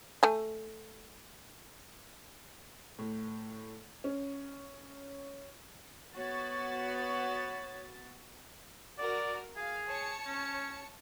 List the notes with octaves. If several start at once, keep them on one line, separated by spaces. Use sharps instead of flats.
A3 G#5
A2
C#4
B3 F#4 C#5 A6
F#4 A#4 D5
G#4 F5
C#5 A5 C#7
C#4